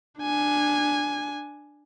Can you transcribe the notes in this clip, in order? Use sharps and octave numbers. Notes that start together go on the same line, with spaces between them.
D4 G#5